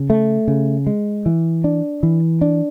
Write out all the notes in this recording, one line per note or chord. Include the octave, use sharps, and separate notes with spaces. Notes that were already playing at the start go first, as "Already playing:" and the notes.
Already playing: C#3
A3
C#3
G#3
E3
D4
E3
D4